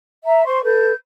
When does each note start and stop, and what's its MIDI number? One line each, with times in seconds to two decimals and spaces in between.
0.25 0.44 76
0.25 0.44 82
0.44 0.62 72
0.44 0.62 84
0.44 0.62 85
0.63 0.93 69
0.63 0.93 71
0.63 0.93 91